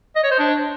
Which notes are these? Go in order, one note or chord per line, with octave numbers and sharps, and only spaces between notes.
D#5
C#5
C5
D4